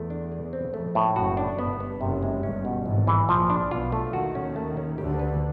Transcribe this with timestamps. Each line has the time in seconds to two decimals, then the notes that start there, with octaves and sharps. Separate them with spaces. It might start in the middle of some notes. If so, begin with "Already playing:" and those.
Already playing: E2 A3
0.10 D4
0.32 G#4
0.53 C4
0.74 F2 A3
0.95 A2
1.16 F#1 F#2 F#4
1.37 D4
1.59 G1 G2 B3
1.80 B3
2.01 F#1 F#2 C3
2.23 G#3
2.43 G1 G2 C#4
2.65 B2
2.86 G#1 G#2 E3
3.07 E3
3.29 A#1 A#2 F3
3.50 D4
3.71 B1 B2 F4
3.92 A3
4.13 D#2 D#3 F#4
4.35 C#4
4.56 A3
4.77 C#4
4.98 D2 D3 G4
5.19 B4